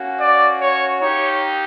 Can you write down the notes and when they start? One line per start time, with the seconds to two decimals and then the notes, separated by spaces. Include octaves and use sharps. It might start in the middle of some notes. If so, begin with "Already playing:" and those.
Already playing: A#3 C#4 F#4
0.20 D5
0.60 C#5
1.01 A#3 D#4 G4 C#5